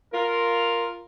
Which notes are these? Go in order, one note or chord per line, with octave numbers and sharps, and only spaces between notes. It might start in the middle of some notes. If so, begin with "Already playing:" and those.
F4 A#4